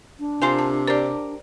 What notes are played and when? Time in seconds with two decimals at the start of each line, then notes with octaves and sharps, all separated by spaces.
0.19 D4
0.42 C3 F4 A#4 C5 G#5 C6
0.59 A5
0.88 G4 A#4 C5 D5